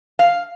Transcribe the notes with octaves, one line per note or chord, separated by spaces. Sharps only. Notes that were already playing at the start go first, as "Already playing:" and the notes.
F5